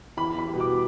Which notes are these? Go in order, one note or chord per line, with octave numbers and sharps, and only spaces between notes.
E2 B5
B5
B2 G3
D6